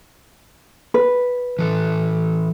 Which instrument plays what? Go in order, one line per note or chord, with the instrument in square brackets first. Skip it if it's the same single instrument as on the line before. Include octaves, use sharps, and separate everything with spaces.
[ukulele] B4
[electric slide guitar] E3 A4